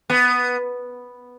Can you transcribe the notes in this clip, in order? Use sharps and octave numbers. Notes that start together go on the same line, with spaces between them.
B3